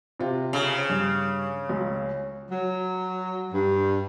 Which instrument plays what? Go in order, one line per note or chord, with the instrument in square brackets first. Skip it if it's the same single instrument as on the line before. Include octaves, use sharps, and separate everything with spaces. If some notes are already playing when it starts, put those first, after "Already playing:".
[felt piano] C3 F4
[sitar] C#3
[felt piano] G2
C#2
[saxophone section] F#3
G2